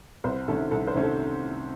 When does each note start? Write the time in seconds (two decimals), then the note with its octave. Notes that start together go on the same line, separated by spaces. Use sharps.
0.24 C2 C5
0.48 C3 D#3 A3 C#4 A4
0.71 C2 A4
0.87 C5
0.95 C3 D#3 A3 C#4
1.03 A4